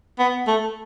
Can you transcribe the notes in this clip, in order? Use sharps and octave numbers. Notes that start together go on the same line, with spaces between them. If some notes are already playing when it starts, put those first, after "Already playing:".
B3
A3